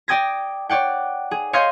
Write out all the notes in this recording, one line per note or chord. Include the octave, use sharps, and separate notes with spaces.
D5 G5 D#6 G#6 A#6
C#5 D5 F#5 G5
G#4
C#5 D#5 F5 C6 G6 G#6